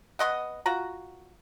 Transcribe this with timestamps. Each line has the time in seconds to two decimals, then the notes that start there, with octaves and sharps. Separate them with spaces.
0.19 B3 C4 D#5 F#5
0.66 F4 F#4 A#5